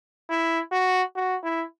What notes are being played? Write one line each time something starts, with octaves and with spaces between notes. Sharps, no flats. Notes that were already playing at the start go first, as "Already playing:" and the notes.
E4
F#4
F#4
E4